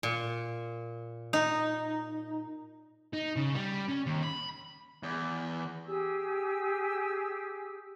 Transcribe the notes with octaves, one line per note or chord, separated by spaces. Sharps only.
A#2
D#4
D#4
C#3
G3
C#4
D#2
B5
E2
G4 G#4 G#5 E6